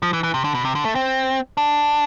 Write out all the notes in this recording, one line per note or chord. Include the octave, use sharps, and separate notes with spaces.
F3
E3
E3
C3
D3
B2
C3
D3
A3
C4
D4